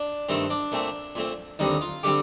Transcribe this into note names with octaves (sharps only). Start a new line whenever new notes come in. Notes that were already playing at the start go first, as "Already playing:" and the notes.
Already playing: D4
G2 D#3 A3 C4
D4
A#2 A3 C4
A#2 A3 C4
D#2 D3 G3 C4 D#4
F4
D3 G3 C4 G4